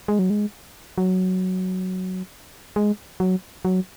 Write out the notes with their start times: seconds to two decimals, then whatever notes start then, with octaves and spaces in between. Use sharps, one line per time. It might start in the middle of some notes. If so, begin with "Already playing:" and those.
0.08 G#3
0.19 F#3
0.30 G#3
0.98 F#3
2.76 G#3
3.20 F#3
3.65 F#3